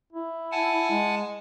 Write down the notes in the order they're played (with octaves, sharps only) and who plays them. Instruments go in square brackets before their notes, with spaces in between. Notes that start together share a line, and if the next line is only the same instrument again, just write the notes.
[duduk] E4
[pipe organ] F#5 G#5 A5
[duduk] G#3